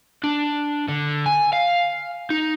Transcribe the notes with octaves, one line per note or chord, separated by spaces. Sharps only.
D4
D3
G#5
F5
D#4